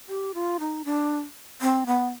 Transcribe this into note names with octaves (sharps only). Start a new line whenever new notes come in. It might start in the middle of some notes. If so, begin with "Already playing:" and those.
G4
F4
D#4
D4
C4
B3